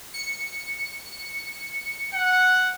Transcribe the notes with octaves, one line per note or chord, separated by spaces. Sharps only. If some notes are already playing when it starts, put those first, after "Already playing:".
C#7
F#5